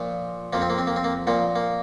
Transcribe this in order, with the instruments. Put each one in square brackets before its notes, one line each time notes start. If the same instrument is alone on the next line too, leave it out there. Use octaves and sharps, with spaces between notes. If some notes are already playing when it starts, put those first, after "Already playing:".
Already playing: [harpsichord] A#2 F3
F2 F3 A#3
C4
A#3
C4
A#3
C4
A#3
A#2 F3 A#3
A#3